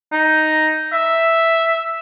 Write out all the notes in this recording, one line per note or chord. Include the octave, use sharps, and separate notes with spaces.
D#4
E5